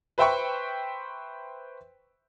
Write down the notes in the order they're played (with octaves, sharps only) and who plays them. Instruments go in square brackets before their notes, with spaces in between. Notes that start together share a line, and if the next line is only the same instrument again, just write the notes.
[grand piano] B4 C5 E5 G5 B5 C#6